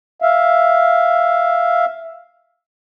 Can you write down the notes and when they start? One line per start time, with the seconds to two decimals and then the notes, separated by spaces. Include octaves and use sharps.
0.22 E5 F5